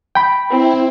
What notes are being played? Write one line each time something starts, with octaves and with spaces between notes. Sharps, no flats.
G5 B5
C4 E4